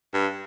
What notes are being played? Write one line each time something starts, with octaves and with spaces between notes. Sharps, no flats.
G2